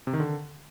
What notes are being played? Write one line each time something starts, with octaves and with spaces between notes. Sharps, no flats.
C3
D#3
D3